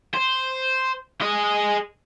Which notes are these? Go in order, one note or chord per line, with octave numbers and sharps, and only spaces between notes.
C5
G#4 D#5